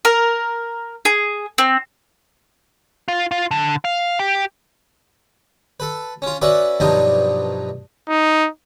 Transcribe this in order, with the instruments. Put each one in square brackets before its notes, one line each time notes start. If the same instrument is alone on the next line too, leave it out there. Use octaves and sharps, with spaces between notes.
[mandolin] A#4
G#4
C4
[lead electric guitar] F4
F4
D3
F5
G4
[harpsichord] A4 B4
C#4 F4
C#4 F#4 B4 D5 E5
G2 B2 F3 F#3 D4 D#4
[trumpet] D#4